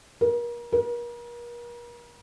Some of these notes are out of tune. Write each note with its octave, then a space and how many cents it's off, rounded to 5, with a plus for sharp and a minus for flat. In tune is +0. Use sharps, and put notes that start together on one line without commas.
A#4 +35
A#4 +40